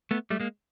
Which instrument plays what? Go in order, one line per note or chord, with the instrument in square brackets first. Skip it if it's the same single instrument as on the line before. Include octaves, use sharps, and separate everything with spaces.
[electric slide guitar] A3 B3
G3 A3
G#3 A#3